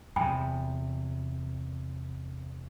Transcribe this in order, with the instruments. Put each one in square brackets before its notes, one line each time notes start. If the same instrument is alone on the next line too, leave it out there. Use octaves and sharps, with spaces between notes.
[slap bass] E2 C3 [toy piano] G5 G#5 B5